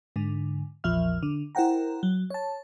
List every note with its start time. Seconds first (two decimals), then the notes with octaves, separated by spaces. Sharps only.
0.16 G#2 D3
0.84 A#1 E2 F3 E5 F6
1.23 D3
1.55 E4 A#4 C5 F#5 G5 A#5
2.03 F#3
2.30 C#5 A5